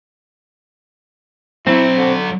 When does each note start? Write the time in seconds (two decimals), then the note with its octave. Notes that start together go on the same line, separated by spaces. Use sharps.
1.67 F#3 B3 C4 D4 E4
1.97 D3